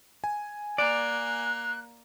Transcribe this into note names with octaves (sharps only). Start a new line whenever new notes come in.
G#5
A#3 D5 F#6